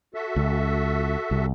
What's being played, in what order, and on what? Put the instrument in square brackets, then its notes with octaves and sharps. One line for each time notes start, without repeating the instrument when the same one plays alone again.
[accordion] F#4 A4 E5
[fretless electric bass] C#2
C2